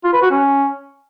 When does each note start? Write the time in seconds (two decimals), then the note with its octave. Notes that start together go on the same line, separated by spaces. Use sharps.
0.04 F4
0.13 B4
0.22 F#4
0.31 C#4